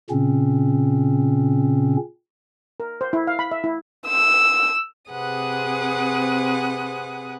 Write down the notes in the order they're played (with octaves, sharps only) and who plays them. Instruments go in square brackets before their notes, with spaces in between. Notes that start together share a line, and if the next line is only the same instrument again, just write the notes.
[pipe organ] A#2 C#3 C4 C#4
[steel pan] A#4
C5
E4
F5
B5
E5
E4
[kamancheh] E6
[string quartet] C3 C4 G#4 B4 F#5 D#6